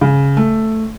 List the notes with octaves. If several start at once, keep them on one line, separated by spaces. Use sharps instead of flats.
C#3
A3